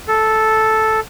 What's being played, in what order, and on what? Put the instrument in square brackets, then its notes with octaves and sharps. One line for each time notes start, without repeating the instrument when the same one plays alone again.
[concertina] A4